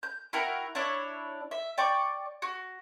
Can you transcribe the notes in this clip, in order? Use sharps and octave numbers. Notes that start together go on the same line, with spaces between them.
G6
E4 F#4 A#4 G5
D4 E4 C#5
E5
D5 G5 C#6
F#4